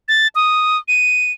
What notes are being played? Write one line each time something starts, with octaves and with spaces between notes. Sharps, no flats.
A6
D#6
D#7